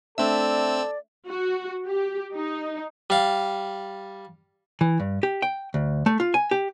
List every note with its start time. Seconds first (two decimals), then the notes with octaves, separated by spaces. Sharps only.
0.18 A3 C4 D4 A4 D5 E5 E6
1.28 F#4
1.87 G4
2.35 D#4
3.10 G3 F5
4.81 E3
5.00 G2
5.23 G4
5.42 G5
5.74 D2
6.06 A3
6.20 F4
6.34 G#5
6.51 G4